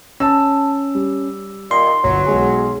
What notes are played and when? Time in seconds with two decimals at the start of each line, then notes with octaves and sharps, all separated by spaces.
0.20 C#4 A5 E6
0.95 G3
1.71 A#2 D#3 C6
2.04 G1 F#3
2.26 B1 G#3 G#4